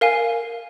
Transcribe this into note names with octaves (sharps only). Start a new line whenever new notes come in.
A#4 F5 G#5